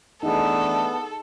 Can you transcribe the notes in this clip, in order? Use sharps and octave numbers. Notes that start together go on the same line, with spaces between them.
E3 A3 B3 D4 D#4 G#4 A4